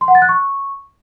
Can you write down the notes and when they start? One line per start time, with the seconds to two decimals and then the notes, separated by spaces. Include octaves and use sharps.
0.01 C6
0.08 F#5
0.15 A6
0.22 F#6
0.29 C#6